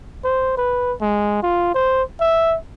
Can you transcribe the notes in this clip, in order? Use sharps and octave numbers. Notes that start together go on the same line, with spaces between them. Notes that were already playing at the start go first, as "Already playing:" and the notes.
C5
B4
G#3
F4
C5
E5